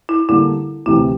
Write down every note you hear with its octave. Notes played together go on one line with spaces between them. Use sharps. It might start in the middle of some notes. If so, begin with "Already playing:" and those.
E4
D3 G3 A#3 D4 E4 A4
D2 C3 E3 E4